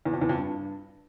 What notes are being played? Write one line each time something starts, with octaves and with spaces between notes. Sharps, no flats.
E2
F2
E2
F2
G2